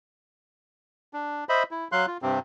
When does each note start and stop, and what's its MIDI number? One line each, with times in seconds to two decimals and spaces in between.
1.13 1.44 62
1.49 1.63 72
1.49 1.63 75
1.49 1.63 76
1.49 1.63 83
1.71 1.88 64
1.92 2.06 54
1.92 2.06 77
1.92 2.06 84
1.92 2.06 90
2.07 2.17 65
2.22 2.39 43
2.22 2.39 48
2.22 2.39 60